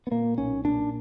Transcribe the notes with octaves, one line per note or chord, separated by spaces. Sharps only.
B3
A#2 A#3
B1 C#4
A#2 D4